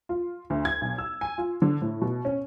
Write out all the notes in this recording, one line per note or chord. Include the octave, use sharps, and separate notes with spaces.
F4
D2
G#6
B1
E6
G#5
F4
D3
A2
B2
C#4